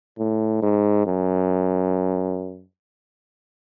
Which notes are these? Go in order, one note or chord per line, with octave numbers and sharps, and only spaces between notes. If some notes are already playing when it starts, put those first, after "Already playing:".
A2
G#2
F#2